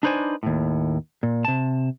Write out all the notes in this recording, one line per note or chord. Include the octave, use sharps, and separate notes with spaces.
D4 D#4 B4 C5 D5 G#5
D#2 A2
A#2
C3 A5